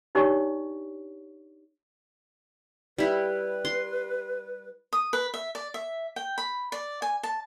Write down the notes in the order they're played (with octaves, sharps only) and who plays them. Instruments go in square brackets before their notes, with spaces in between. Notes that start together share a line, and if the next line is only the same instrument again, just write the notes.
[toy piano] D4 D#4 G4 C#5 D5 C#6
[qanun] G3 E4 [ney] B4
[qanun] C6
[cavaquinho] D#6
B4
E5
D5
E5
G5
B5
D5
G#5
A5